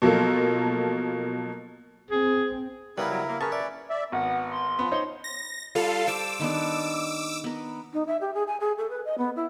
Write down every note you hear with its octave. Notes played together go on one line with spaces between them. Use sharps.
B2 F3 F#3 A#3 A4
C4 G#4
C#3 G3 B3 C#4 E4 A#4 B4
F#3
A#3
C#4 G#4 A#4 B4 C#5 A5 C#6
D5 E5
D5 E5
G#1 B3 F#5
C6
F3 B3
D#4 C5 C#5 C6
A#6
G3 F4 A4 F5
C5 A5 D6 E6
D#3 B3 D4
B3 A#4
D#4
E5
G4
G#4
G#5
G#4
A4
B4
D#5
B3
E4